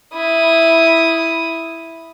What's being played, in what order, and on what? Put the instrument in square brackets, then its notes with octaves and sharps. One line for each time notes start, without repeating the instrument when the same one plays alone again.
[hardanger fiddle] E4 D#6